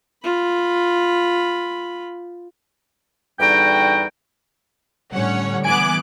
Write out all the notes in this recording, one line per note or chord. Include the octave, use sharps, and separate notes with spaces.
F4 B5
E2 D3 G3 D#4 F#4 G5
A2 D3 G3 C#4 C#5 F#5
E3 B3 G#5 D6 F#6 D7